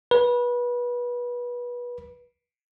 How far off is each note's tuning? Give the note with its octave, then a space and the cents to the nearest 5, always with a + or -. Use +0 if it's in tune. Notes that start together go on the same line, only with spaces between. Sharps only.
B4 -25